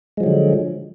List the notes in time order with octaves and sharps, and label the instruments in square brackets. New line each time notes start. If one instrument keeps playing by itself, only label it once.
[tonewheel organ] G#3
F3
F#3
D3